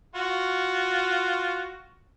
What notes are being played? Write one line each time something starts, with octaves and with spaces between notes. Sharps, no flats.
F4 F#4